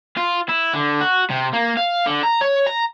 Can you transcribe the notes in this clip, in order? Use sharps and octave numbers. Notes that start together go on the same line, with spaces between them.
F4
E4
D3
F#4
C3
A#3
F5
D3
A#5
C#5
A#5